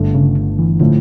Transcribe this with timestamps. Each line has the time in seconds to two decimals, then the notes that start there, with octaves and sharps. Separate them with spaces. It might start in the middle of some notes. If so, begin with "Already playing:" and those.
Already playing: G1 G2 D3 A3
0.14 C#3
0.59 E3
0.80 A2 D3 F3 A3